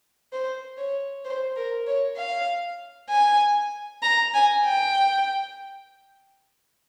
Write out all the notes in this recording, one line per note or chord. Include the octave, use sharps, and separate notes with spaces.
C5
C#5
C5
A#4
C#5
F5
G#5
A#5
G#5
G5